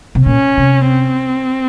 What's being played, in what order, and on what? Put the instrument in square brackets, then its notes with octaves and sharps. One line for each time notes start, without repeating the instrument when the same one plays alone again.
[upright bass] C3
[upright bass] A#2 [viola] C#4
[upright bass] C3
[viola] C4